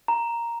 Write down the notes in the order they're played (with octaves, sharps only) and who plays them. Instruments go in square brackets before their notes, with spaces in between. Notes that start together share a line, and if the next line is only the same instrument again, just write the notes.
[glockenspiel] A#5